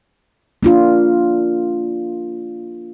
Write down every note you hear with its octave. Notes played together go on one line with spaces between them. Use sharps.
A#3 D4 F4